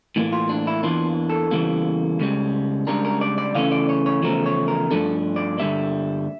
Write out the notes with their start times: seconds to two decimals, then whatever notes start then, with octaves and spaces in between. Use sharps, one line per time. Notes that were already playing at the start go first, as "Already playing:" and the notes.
0.16 A2 E3 G3 A#3
0.33 F4
0.49 D4
0.67 E4
0.83 E2 E3 A#3 D4 F4
1.30 A4
1.51 E2 C#3 E3 G3 A#3
2.20 C#2 C#3 G3
2.87 C#2 C#3 G3 D4 A#4
3.05 A#4
3.21 D5
3.38 D5
3.55 C#3 E3 A3 C#4 F5
3.72 D5
3.89 C#5
4.06 C#5
4.23 E2 C#3 F3 A3 A#4
4.46 C#5
4.68 A#4
4.91 G2 F3 A3 D4 A4
5.36 D5
5.58 G2 D3 G3 A#3 E5